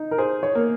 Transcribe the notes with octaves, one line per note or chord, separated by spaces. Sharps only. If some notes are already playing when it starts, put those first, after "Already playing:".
Already playing: D#4
A#4
G#4 C5
C#5
A#3